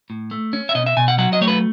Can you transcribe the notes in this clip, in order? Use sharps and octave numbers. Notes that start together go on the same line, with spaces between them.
A2
A3
C#4
E5
B2 D#5
E5
B2 G#5
F#5
F#3 F#5
D#5
A3 C#5
B4